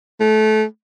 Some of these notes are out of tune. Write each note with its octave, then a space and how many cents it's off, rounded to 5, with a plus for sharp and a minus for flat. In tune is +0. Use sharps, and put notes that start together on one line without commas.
A3 -25